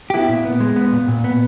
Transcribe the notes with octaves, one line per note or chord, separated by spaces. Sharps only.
G4
B3 E4
A#2
B3
G#3
B3
A#2
A#2
B3